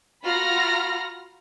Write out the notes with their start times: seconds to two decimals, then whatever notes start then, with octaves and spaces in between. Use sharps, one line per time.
0.23 F4 F#4 A#5 B5 F6 A#6